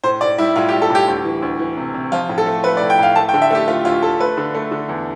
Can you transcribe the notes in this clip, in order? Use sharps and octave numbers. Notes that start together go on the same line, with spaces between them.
A2 C5
A2 D5
G3 E4
A2 F4
G4
G3
A4
A2 G4
D2
E3
D2
E3
C3
C3
F3 F4
A2
A4
A3
A3 B4
D5
A2
G5
A2 F5
A3 A5
G5
D3
E5
A3 G4
A3 F4
D2 F4
D2 A4
A3 B4
D3
A3
D3
E2